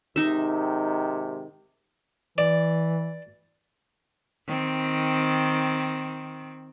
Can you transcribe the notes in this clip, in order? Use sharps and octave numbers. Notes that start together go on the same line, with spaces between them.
G#2 C3 D#3 D#4 E5
E3 D5
D#3 C4